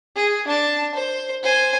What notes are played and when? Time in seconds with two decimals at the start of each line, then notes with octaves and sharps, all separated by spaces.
0.16 G#4
0.47 D4 A5
0.95 C5
1.43 C5 G#5